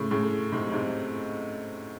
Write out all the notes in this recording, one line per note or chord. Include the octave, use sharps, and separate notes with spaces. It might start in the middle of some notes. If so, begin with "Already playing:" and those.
Already playing: A2 C#3
A2 C#3
G#2 C3
G#2 C3